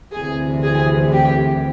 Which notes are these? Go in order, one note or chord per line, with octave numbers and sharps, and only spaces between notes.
D2 C3 E3 G#4
G#4
G4